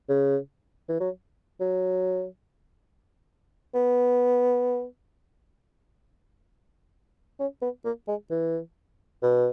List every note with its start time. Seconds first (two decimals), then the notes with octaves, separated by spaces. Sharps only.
0.09 C#3
0.88 E3
1.00 F#3
1.60 F#3
3.74 B3
7.40 C#4
7.62 B3
7.85 A#3
8.08 G#3
8.31 E3
9.22 B2